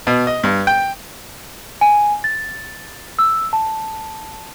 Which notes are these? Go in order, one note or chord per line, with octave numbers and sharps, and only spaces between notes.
B2
D#5
G2
G5
G#5
A6
E6
A5